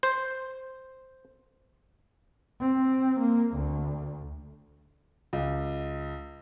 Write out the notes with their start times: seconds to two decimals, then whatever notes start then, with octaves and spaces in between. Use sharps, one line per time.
0.03 C5
2.60 C4
3.20 A#3
3.55 D2
5.33 C#2